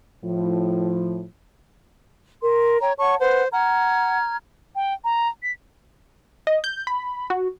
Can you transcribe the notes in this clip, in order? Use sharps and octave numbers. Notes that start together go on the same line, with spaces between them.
A2 F3
A#4 C6
C#5 G5 A#5
C#5 F#5 A5 C#6
B4 C5 F#5
F#5 A#5 F6 G#6
G5
A#5
B6
D#5
G6
B5
F#4